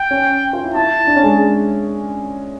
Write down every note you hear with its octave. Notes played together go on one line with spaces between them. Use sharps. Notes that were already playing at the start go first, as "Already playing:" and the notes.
Already playing: G5
C#4
F4
E4
E4 A5
D4
C#4
G#3